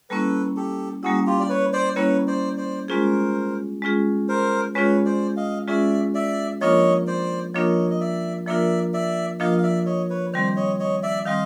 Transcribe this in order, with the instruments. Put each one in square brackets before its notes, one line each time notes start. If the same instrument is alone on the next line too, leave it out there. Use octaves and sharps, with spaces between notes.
[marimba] G3 A#3 C#4 E4 [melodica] A4 B4
[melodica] G4 A4
[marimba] G3 A#3 C#4 E4 [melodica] F#4 G#4
[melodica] F4 G4
D5
B4 C#5
C5 D5
[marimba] G3 A#3 C#4 E4 [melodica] B4 C#5
[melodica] C5 D5
C5 D5
[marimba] G#3 C#4 F4 G#4 [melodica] A#4 C5
[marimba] G#3 C#4 F4 G#4
[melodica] A#4 C5
[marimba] G#3 C#4 F4 G#4 [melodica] B4 C#5
[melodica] C5 D5
D#5 F5
[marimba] G#3 C#4 F4 G#4 [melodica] D5 E5
[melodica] D5 E5
[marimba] F3 A#3 D4 F4 A#4 [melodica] C#5 D#5
[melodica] C5 D5
[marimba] F3 A#3 D4 F4 A#4 [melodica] C#5 D#5
[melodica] D#5
D5 E5
[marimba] F3 A#3 D4 F4 A#4 [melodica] D5 E5
[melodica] D5 E5
[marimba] F3 A#3 D4 F4 A#4 [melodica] D#5 F5
[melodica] F5
D5 E5
C#5 D#5
B4 C#5
[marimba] D#3 G3 C4 [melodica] C5 D5
[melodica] C#5 D#5
C#5 D#5
D5 E5
[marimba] D#3 G3 C4 [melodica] D#5 F5